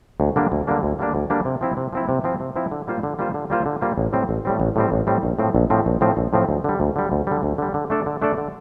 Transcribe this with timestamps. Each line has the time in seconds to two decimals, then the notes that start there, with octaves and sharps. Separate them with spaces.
0.20 D2
0.36 D3 G3 A#3 D4
0.52 D2
0.67 D3 G3 A#3 D4
0.83 D2
0.99 D3 G3 A#3 D4
1.15 D2
1.30 D3 G3 A#3 D4
1.45 C3
1.61 F3 C4 E4
1.77 C3
1.93 F3 C4 E4
2.09 C3
2.24 F3 C4 E4
2.40 C3
2.56 F3 C4 E4
2.72 D3
2.87 G3 A#3 F4 C5
3.03 D3
3.19 G3 A#3 F4 C5
3.34 D3
3.50 G3 A#3 F4 C5
3.66 D3
3.81 G3 A#3 F4 C5
3.98 A1
4.13 A2 G3 C4
4.29 A1
4.45 A2 G3 C4
4.60 A1
4.76 A2 G3 C4
4.92 A1
5.07 A2 G3 C4
5.23 A#1
5.39 A2 F3 C4
5.55 A#1
5.70 A2 F3 C4
5.86 A#1
6.01 A2 F3 C4
6.17 A#1
6.33 A2 F3 C4
6.49 D2
6.64 D3 G3
6.80 D2
6.96 D3 G3
7.12 D2
7.27 D3 G3
7.43 D2
7.58 D3 G3
7.74 D3
7.90 A3 D4 A4 D5
8.06 D3
8.22 A3 D4 A4 D5
8.38 D3